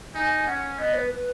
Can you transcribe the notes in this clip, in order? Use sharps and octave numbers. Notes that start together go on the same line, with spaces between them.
D#4 G#5
G#5
C#4 F#5
B3 D#5
B4
B4